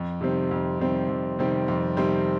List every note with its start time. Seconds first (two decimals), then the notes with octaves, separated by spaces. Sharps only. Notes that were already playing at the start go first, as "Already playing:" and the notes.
Already playing: F2
0.21 C3 D#3 G3 C4
0.51 F2
0.79 C3 D#3 G3 C4
1.09 F2
1.39 C3 D#3 G3 C4
1.68 F2
1.97 C3 D#3 G3 C4